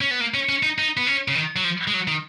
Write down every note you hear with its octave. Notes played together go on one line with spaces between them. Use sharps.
C#4
B3
A#3
C#4
C#4
D#4
D#4
B3
C#4
C#3
D#3
F#3
F3
G#3
F#3
D#3